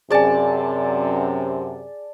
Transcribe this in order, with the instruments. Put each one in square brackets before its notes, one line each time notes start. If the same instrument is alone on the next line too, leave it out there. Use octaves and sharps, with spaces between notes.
[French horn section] F#2 C3 [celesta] G#4 G#5 [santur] D5 A5